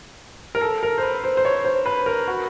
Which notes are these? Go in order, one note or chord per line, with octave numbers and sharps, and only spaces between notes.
A#4
A4
A#4
C5
B4
C5
C5
C#5
C5
B4
A#4
F#4